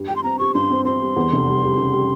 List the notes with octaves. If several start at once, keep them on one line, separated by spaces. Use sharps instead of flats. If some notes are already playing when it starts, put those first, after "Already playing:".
Already playing: G2 G3
G4 G5
C6
C4 A#5
G4 C#6
G2 C6
C4
C4 C6
G3
E2
F1
G3
G3
C#3
G3